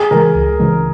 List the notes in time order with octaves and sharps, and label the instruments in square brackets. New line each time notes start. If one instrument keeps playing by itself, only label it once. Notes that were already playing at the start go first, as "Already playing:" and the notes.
Already playing: [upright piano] G#4
[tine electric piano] C#3 E3 G#3 [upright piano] A#4
[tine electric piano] C#2
C#3 E3 G#3